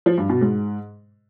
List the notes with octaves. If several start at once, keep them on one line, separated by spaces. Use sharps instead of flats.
F3
G2
B2
G#2